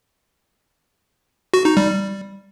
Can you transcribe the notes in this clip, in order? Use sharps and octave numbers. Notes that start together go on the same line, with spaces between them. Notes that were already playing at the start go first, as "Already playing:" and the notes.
F#4
D#4
G3